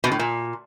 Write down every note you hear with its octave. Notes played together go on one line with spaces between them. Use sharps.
B2
A2
A#2